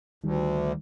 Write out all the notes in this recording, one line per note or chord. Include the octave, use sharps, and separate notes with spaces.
D2 D#3 G3